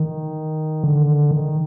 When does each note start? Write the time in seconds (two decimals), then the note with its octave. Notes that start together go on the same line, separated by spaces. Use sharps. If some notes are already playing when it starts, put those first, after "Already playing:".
Already playing: D#3
0.84 D3
1.31 D#3